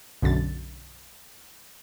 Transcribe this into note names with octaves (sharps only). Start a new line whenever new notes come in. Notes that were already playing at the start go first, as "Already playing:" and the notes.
B1 F#2 D3 A6